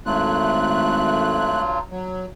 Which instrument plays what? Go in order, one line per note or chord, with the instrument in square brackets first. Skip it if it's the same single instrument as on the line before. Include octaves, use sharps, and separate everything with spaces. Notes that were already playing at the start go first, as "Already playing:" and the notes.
[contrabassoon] G#1 [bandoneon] G2 F#3 F4 [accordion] A3 F#6
[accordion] F#3